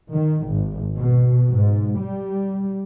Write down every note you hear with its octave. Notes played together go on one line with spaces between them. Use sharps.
D#3
G#1
B2
G#2
G3